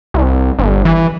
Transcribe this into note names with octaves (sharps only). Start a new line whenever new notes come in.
C2
G1
E3